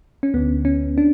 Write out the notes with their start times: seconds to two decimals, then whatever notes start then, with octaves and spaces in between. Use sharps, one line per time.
0.23 C#4
0.34 D2 D3 B3
0.65 C#4
0.98 D4